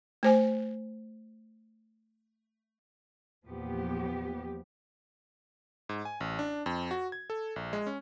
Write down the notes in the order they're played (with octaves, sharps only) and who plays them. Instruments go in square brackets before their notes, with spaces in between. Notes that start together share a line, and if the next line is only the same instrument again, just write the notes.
[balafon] A3 C5 G#5
[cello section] E2 A#2 F3 B3 G4
[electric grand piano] G#2
G#5
A1
D4
F2
F#4
G#6
A4
A#1
G#3
C#4